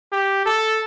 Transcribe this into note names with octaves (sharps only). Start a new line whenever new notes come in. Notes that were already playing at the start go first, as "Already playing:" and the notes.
G4
A4